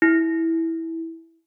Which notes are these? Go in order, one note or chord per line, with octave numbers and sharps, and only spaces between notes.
E4